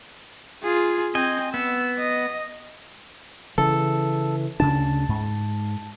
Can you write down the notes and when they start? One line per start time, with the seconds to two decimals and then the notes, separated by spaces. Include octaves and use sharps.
0.63 F4 G#4
1.15 C4 D#5 G#5 G6
1.54 B3 E6
1.99 D#5
3.58 C#3 E3 A4
4.60 D2 C#3 D4 A5
5.09 G#2